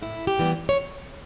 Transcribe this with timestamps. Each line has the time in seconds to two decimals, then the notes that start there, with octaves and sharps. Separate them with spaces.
0.02 A2 E4
0.27 G4
0.39 E3 G3 B3
0.69 C#5